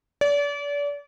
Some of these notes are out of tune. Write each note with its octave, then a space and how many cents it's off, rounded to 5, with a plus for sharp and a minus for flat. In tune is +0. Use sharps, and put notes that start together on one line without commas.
D5 -35